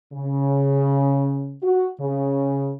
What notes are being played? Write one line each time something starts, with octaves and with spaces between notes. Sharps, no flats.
C#3
F#4
C#3